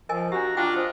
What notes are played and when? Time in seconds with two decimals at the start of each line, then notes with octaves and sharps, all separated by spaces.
0.09 F3 A#4 D#5 G#5
0.32 D4 F#4 G4 A#5
0.57 D4 F4 G5
0.76 C5 D#5